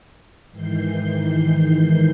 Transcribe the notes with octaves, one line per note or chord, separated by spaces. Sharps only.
G#2 D#3 E3 G6 C7